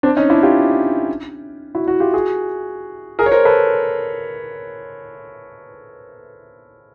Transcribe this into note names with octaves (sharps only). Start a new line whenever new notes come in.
C4 D4
C#4 D#4
D4 E4
F4 G4
E4 F#4
E4 F#4
F4 G4
F#4 G#4
G#4 A#4
C#5
A#4 C5
A4 B4